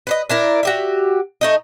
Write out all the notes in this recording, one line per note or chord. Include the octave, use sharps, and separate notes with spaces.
B4 C5 D#5
D4 E4 A#4
F#4 G4 E5
A3 D#4 D#5